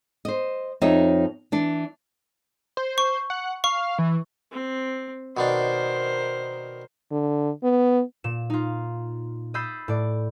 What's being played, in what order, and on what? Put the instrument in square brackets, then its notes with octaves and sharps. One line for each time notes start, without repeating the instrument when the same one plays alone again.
[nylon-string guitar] C5 D#5
F2 D#4 C#5 D#5 E5
E3 D4
[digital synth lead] C5
[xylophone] C#6
[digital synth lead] F#5
[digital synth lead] F5 [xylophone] C#6
[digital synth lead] E3
[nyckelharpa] C4
[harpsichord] B2 D#3 D4 [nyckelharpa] A#4 C5
[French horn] D3
B3
[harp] A#2 E7
D#4 F4
D#5 B5 E6 G6 A6 C7
A2 D5